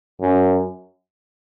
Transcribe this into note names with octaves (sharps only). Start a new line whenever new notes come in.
F#2